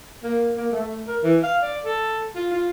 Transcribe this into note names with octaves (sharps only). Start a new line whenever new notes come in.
A#3
A#3
A3
A#4
E3
F5
D5
A4
F4
F4